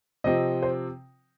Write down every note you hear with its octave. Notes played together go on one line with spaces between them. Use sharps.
C3 F3 C4 D#5
C5